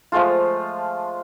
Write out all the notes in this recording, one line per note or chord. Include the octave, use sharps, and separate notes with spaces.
F3 G#3 A3 F4